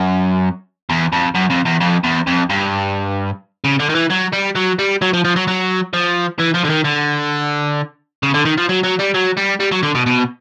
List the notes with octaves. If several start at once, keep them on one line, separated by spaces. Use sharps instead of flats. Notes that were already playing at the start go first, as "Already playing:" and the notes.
Already playing: F#2
E2
F2
F#2
F2
E2
F2
E2
F2
G2
C#3
D3
D#3
E3
F#3
G3
F#3
G3
F#3
F3
F3
F#3
F#3
F3
E3
F3
D3
D#3
D3
C#3
D3
D#3
F3
F#3
F#3
G3
F#3
G3
G3
F#3
D3
B2
B2